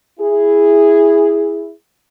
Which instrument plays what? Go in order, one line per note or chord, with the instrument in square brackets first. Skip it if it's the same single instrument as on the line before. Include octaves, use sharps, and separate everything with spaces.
[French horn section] E4 G#4